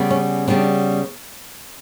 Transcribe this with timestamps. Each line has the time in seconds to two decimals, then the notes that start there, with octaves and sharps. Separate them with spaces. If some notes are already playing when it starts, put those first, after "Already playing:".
Already playing: C#3 G3 B3
0.10 C#4
0.47 C#3 G3 B3 D4